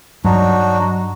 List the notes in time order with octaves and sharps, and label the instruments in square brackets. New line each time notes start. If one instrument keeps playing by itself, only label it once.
[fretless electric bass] G2 [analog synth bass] F#3 [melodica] D4 D#4 F#4